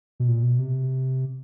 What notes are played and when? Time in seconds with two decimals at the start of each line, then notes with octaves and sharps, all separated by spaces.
0.20 B2
0.28 A#2
0.43 B2
0.59 C3